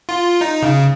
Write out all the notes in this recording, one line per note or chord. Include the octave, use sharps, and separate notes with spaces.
F4
D#4
C#3